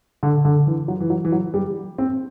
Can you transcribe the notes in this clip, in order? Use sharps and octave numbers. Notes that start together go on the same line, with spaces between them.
D3
D3
E3
F#3
E3
F#3
E3
F#3
G3
C4